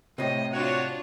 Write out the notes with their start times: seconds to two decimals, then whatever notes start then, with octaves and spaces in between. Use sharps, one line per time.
0.18 A2 C3 D#5
0.53 D4 F4 F#4 C#5